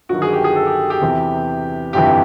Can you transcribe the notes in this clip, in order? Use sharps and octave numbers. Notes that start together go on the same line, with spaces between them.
G1 G2 D#3 F#3 F#4
G#4
G4
G#4
A4
G4
G4
E2 C3 E3
G1 F2 C3 E3 G4